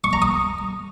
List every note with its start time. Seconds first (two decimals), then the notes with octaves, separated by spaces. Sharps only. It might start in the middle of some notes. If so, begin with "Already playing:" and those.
0.04 C#6
0.13 A#5
0.22 D#6